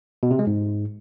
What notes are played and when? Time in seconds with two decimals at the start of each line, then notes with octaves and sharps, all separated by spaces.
0.23 B2
0.31 C3
0.39 G#3
0.47 G#2